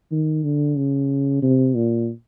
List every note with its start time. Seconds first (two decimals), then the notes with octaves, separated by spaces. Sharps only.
0.11 D#3
0.44 D3
0.77 C#3
1.42 C3
1.75 A#2